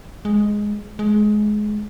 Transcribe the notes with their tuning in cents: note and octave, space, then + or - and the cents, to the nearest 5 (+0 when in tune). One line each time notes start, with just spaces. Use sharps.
G#3 +0
G#3 +20